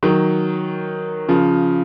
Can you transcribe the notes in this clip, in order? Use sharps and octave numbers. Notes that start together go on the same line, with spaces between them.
D#3 F#3
C#3 F3